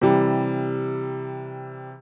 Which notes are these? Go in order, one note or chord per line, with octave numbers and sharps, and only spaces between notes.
C3 E3 G3